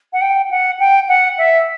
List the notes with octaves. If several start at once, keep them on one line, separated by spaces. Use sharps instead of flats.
F#5
G5
F#5
G5
F#5
E5